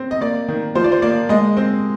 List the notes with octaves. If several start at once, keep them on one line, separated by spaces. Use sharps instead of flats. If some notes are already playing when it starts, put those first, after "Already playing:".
Already playing: C4
D#5
A#3 D5
D#3
F3 C5
D5
C5
A#3 D5
G#3 D#5
C4